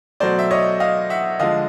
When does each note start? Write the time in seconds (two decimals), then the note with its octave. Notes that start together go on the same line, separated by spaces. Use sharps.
0.20 B2 F#3 A3 C5 D5
0.39 E5
0.51 C#5 D#5
0.80 D#5 F5
1.10 E5 F#5
1.39 D3 F3 G#3 D#5 F5